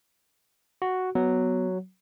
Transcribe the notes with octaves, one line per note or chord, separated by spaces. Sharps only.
F#4
F#3 B3